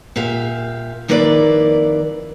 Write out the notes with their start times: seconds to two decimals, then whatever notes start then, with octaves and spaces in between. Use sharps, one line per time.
0.16 A#2 G4 E5 F5
1.08 F2 D#3 A#3 E4 B4 D5